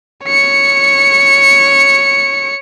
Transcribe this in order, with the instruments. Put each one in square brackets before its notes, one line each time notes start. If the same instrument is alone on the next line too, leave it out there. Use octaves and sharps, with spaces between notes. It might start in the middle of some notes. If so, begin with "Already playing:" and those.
[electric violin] C#5 C#7